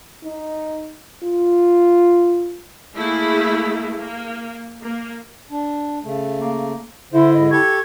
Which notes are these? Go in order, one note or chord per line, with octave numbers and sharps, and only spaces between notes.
D#4
F4
A3 A#3 E4 G#4
A#3
A#3
D4
C#3 A3
A#3
D3 E4 C5 E5
G#2 D#5
G4 A4 C#6 G#6